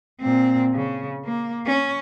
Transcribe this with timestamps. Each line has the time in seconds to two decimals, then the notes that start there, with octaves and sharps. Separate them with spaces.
0.20 A#2 C4
0.74 C#3
1.25 A#3
1.66 C#4